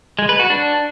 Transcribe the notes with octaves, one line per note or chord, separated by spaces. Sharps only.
G#3
B4
F#4
D4